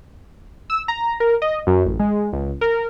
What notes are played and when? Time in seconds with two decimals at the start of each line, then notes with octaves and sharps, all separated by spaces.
0.70 E6
0.88 A#5
1.20 A#4
1.42 D#5
1.67 F#2
1.85 A1
1.99 G#3
2.33 C#2
2.61 A#4